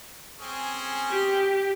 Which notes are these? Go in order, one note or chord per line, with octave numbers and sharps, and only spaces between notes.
C4 C#4 G#4
G4